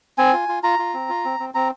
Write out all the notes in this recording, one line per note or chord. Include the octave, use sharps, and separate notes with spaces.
C4 G#5
F4
F4
F4 A#5
F4
C4
F4
C4
C4
C4 A#5